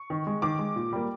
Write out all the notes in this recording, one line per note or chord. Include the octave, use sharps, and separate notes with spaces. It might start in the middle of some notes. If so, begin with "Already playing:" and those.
Already playing: C#6
D#3
G#3
D#3 D6
G#3
A#2
G3 A#3